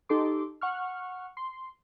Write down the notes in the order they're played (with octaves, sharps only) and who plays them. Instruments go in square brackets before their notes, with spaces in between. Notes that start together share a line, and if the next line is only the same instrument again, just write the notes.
[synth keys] D#4 G4 A4 C6 D6
F#5 C#6 F6
C6